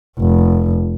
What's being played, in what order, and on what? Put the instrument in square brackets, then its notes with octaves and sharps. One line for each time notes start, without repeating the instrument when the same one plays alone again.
[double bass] F1